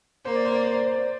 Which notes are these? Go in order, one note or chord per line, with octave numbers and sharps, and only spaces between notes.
A#3 C5
D5
C5
D5
C5
D5
C5
D5